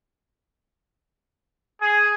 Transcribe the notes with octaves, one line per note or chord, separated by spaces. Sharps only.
G#4